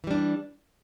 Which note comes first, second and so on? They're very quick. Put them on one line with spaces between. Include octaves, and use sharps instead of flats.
E3 G3 D4